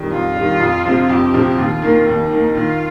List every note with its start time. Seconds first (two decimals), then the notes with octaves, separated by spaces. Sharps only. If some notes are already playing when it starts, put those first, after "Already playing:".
Already playing: F2 D#3 G3
0.12 F2 F4
0.36 D#3 G3
0.60 F2
0.85 C3 F3 C4
1.10 F2 G4
1.33 C3 F3 C4
1.58 D#2 F4
1.82 D#3 A#3
2.06 D#2 D#4
2.30 D#3 A#3
2.54 D#3 F4